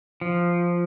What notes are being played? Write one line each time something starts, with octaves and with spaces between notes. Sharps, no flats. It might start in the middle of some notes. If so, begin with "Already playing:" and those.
F3